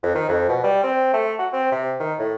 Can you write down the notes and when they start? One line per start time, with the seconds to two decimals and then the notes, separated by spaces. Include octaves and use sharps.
0.03 F2
0.15 D#3
0.28 F2
0.49 B2
0.63 G3
0.83 C4
1.13 A3
1.39 F#4
1.53 C4
1.71 C3
2.00 D#3
2.18 A2